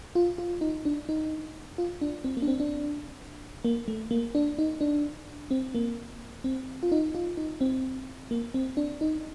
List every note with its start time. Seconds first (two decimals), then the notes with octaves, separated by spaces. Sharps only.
0.15 F4
0.38 F4
0.61 D#4
0.85 D4
1.09 D#4
1.78 F4
2.01 D4
2.24 C4
2.37 A#3
2.42 D4
2.48 C4
2.60 D4
3.65 A#3
3.88 A3
4.11 A#3
4.35 D4
4.59 D#4
4.81 D4
5.51 C4
5.75 A#3
6.44 C4
6.83 F4
6.92 D#4
7.15 F4
7.37 D#4
7.61 C4
8.31 A#3
8.54 C4
8.77 D4
9.01 D#4